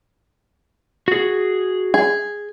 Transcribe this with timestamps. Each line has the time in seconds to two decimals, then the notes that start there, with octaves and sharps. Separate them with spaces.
1.08 F#4 G#4
1.94 G#4